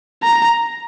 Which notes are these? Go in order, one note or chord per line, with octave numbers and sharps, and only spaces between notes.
A#5